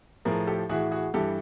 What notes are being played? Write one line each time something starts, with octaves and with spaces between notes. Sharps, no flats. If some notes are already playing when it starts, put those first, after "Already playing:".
A2 F3 G#4 A#4
G4 A4
A2 E3 F#4 G#4
F#4 G#4
G2 E3 G4 A4